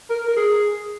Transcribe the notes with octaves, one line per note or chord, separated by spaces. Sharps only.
A#4
A#4
G#4